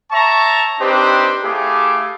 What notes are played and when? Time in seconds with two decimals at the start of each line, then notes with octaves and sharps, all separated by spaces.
0.11 C#5 E5 A5 A#5 C#6
0.79 C4 D4 D#4 G4 B4 C5
1.43 A3 E4 G4 G#4 F5 D6